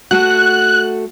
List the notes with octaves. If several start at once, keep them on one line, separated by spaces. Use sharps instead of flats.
A3 F#4 F#6